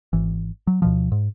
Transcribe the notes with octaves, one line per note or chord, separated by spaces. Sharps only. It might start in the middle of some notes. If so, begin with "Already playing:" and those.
G#1 E3
F#3
D2 B2 F3
G#2